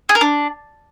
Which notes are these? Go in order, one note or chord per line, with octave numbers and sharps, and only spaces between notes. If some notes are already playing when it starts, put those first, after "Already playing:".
G#4
A#4
D4